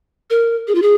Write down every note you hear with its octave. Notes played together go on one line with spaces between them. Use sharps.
A#4
G#4
F4
G#4